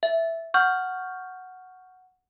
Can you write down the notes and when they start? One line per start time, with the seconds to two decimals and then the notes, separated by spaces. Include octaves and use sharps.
0.03 E5
0.54 F#5 C#6 F6 G6